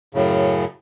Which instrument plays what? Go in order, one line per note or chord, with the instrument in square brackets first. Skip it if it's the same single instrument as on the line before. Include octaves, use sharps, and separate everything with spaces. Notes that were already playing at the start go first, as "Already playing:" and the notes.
[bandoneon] F#2 A2 C#3